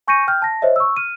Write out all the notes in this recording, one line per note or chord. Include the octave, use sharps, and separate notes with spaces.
G#5 C#6 G6 A#6 C#7 D#7
G5 F6 G6
A5 A#6
C5 C#5 D#5 E5
C#6 E6
F6 D#7